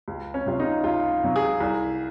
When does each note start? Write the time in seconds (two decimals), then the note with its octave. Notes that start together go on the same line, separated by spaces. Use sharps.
0.08 C#2
0.34 C#4
0.46 C3 F#3 F4
0.60 D#4
0.84 C#2 F4
1.23 C3 F#3
1.36 G#4
1.60 C2